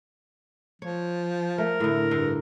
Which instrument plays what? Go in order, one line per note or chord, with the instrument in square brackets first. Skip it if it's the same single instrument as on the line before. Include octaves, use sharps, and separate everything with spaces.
[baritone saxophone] F3 [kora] C#5
[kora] A3 [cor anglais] A#4
[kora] A2 D3
[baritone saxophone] G2 [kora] D3